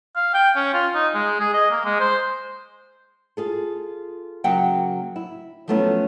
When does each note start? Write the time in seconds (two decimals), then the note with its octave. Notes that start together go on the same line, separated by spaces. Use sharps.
0.16 F5
0.34 G5
0.55 C#4
0.73 F4
0.95 D#4
1.14 G#3
1.40 G#4
1.54 D#5
1.71 A#3
1.85 G#3
2.00 C5
3.37 F4 G#4 A4
4.44 C#3 F#3 A#3 E5 F#5 G5
5.16 E4
5.68 F3 F#3 A3 B3 C#4 E4